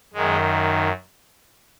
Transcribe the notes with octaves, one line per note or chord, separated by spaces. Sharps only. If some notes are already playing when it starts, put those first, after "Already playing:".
F#2 D#3 G#3